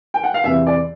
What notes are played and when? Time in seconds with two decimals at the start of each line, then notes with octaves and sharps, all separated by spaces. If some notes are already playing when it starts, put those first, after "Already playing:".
0.14 G5
0.24 F#5
0.34 F5
0.44 E2 C3 E3 E5
0.67 D5